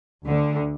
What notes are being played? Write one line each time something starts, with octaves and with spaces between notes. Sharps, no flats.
D2 D3